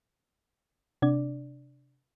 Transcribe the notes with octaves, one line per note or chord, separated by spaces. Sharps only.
C3 D4 D5